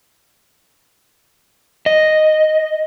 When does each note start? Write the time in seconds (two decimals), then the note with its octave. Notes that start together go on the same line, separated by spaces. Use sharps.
1.86 D#5